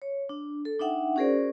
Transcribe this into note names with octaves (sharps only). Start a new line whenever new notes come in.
C#5
D4
A4
D4 D#4 E5 F#5 G5
C#4 F#4 G#4 A#4 C5 D5